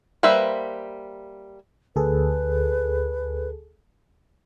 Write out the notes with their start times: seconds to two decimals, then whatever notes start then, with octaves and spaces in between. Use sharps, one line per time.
0.23 G3 A#3 B4 C5 E5
1.96 D2 G#4 A4 B4